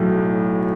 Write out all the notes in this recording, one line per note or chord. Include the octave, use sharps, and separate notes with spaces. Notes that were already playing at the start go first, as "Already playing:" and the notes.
Already playing: B1 A2 F#3